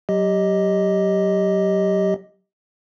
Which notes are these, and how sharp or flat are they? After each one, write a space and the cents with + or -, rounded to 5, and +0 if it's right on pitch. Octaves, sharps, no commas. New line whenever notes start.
F#3 +20 G4 +0 D#5 +0